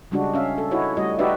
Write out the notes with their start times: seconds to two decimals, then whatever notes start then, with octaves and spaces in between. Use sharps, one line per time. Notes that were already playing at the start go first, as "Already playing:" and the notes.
0.11 C#3 G3 G#3 D4 F#4
0.34 C#4 E5 F5
0.58 A4
0.71 D#4 E4 F#4 C#5
0.97 G3 A3 F#4 D#5
1.19 D#4 F#4 G4 B4 D5 E5